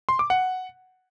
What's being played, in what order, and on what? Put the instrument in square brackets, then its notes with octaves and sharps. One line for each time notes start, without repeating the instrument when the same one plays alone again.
[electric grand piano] C6
D6
F#5